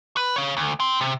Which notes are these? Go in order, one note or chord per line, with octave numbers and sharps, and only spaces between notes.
B4
C#5 F5
D2
G5 C6
C3